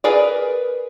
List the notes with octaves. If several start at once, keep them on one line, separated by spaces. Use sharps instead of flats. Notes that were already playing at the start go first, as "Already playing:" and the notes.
G#4 A#4 B4 D5